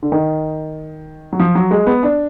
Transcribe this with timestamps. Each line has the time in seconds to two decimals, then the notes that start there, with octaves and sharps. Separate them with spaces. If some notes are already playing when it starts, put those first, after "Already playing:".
0.03 D3
0.12 D#3
1.32 F#3
1.40 F3
1.55 F#3
1.71 G#3
1.86 B3
2.03 D4